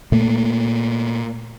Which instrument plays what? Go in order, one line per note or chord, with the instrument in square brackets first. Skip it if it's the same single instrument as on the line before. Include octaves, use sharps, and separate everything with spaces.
[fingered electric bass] A#2 A3 A#3